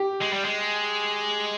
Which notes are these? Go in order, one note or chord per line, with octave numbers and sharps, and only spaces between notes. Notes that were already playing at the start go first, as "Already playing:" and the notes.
Already playing: G4
G#3
G3
G#3